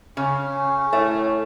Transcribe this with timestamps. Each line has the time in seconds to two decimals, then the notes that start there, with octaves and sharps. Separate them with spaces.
0.17 C#3 C#4
0.93 A2 A3